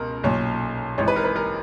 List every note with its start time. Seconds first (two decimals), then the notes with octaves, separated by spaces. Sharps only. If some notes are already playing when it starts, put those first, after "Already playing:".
Already playing: C#2 B2 A#4
0.24 B1 A#2 C#5
0.98 G#1 G#2 E3 C#5
1.08 B4
1.16 A#4
1.24 B4
1.36 A#4